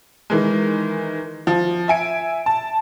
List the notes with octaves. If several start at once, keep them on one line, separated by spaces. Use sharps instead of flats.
D#3 E3 G#3
F3
E5 G#5 D7
A5